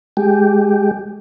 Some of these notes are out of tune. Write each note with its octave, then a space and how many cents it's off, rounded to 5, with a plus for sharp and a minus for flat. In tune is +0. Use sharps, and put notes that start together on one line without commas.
G#3 +0 G4 +0